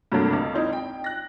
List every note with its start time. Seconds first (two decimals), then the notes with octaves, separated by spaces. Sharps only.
0.12 G2 C3 F#3 A3 A#3 D4
0.33 C#2
0.54 C4 D#4 E4
0.73 G5
1.04 F#6 A#6